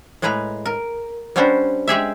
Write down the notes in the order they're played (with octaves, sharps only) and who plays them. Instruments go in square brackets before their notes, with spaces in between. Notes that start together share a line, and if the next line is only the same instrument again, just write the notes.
[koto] A2 G#3 G#4 B4 A#5
A#4
G3 B3 C#4 D4 C5
G#3 G4 G#4 E5